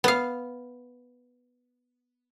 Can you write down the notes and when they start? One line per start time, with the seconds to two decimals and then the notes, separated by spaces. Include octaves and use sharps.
0.04 B3 F5